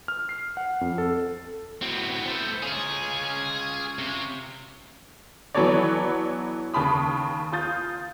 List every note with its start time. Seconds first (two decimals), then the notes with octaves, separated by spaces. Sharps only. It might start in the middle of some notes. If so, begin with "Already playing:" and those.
0.08 F6
0.29 C7
0.57 F#5
0.81 F2
0.98 A4
1.82 A2 F#3 B3 C4
2.27 A3 B3 C5
2.62 C#4 F4 G#4
3.99 C3
5.55 E3 F#3 B3 A4 C#5 D5
6.74 D#2 C#3 A5 B5 D#6
7.52 F4 D#6 G6 A6